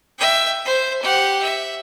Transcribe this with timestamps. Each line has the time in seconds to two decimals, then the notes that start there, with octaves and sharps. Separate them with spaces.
0.18 E5 G5
0.65 C5
1.03 G4 F#5
1.42 E5